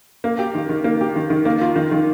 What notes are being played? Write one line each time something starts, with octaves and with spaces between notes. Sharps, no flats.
A#3
G4
D#3
D#3
A#3
G4
D#3
D#3
A#3
F4
D#3
D#3